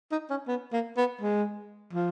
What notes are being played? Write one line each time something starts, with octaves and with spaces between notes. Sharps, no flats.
D#4
C#4
B3
A#3
B3
G#3
F3